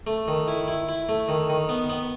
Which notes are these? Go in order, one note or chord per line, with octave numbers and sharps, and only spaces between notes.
A3
D#3
E4
E4
E4
A3
D#3
D#3
B3
B3